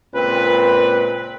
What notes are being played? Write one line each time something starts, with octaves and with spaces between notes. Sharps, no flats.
C#2 A#2 C4 B4